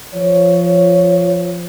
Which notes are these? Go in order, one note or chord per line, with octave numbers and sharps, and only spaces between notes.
F3 C#5